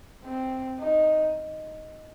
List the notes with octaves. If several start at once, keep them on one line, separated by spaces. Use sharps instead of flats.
C4
D#4